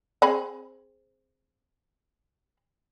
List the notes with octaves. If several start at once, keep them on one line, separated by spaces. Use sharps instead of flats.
C4 G#4 B5